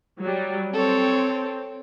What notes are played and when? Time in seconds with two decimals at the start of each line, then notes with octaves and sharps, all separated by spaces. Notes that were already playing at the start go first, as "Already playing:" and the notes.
0.21 F#3 G3
0.73 C4 A4 C#5